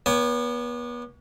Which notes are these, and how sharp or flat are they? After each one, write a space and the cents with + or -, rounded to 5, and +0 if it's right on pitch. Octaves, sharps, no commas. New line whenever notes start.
B3 -35 C#5 +35 G#5 -40